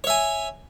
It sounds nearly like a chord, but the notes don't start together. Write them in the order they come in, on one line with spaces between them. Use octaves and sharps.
C#5 E5 G#5